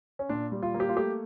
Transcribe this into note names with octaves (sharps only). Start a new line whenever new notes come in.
C#4
A#2 D4
G3
F4
A#3
G4
F4
A3 G4